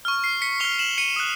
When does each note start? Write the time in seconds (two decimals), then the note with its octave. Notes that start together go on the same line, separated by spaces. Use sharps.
0.05 C#6 F6
0.24 C7
0.42 B6 C#7
0.60 C#6 F6 F7 G7
0.79 E7 F#7
0.98 C#7 D#7
1.16 D#6 F#6